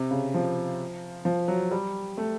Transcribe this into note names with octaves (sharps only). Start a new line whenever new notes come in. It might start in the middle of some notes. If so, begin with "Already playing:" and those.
Already playing: C3
C#3
F3
F3
F#3
G3
A3